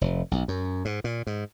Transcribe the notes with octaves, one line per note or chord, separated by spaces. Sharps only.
F1
B1
F#2
G#2
A#2
G#2